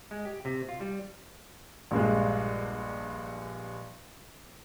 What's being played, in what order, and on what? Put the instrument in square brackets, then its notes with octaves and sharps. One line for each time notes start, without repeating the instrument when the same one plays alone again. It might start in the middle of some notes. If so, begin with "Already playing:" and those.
[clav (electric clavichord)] G#3
G4
C3
F4
G3
[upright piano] A#1 G2 G#3